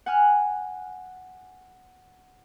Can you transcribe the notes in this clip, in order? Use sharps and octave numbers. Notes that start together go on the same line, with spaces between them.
F#5 G#5 F6 F#6